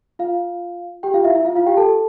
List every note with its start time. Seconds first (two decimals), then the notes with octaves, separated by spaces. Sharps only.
0.19 F4 F5
1.03 G4 G5
1.14 F4 F5
1.24 E4 E5
1.35 E4 E5
1.45 F4 F5
1.56 F4 F5
1.66 G4 G5
1.77 A4 A5